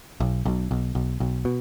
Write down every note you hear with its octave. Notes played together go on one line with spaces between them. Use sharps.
B1
B1
B1
B1
B1
B2